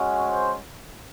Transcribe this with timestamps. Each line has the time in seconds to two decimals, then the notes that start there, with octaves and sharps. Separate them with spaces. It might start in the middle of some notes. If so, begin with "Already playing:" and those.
Already playing: G#3 C#4 F#4
0.30 C5